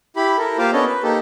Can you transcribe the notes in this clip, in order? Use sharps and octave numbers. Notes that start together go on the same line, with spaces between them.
E4 G4 B5
E4 A4 A#4
A#3 F4 G4 C5 F5 D6
B3 C#4 D4 A4 C#5 D#5
B4
A#3 D#4 G4 A4